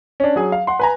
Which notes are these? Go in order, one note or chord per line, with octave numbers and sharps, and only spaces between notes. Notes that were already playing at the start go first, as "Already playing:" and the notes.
C#4 D4
F#3 G#4 G#5
F5
F#5 C6
B4 G#5 A#5